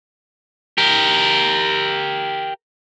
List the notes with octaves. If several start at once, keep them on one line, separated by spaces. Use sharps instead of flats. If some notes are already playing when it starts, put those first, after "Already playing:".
G4 A#4